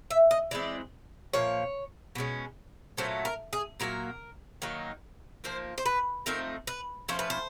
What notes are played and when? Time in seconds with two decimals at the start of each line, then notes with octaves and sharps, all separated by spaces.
0.11 E5
0.31 D#5
0.51 E3 G#3 C4 D5
1.33 A#2 F3 A#3 C#5
2.15 B2 G#3 C#4
2.98 A#2 F#3 A3 C#4 C5
3.25 A#4
3.53 G#4
3.80 A#2 F#3 A#3 A#4
4.62 D#3 F#3 A#3 D#4
5.44 F3 A#3 D#4 C5
5.78 C5
5.86 B4
6.26 F3 A3 C4 D#4 A#4
6.67 B4
7.09 F3 A3 C#4 C5
7.19 B4
7.30 C5